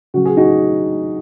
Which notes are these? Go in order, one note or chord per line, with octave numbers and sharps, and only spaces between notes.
C#3 F#3 F#4
G#4
D#4 F#4